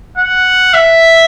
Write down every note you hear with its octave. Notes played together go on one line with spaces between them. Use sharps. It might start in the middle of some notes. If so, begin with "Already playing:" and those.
F#5
E5